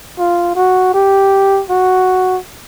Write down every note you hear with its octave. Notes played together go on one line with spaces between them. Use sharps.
F4
F#4
G4
F#4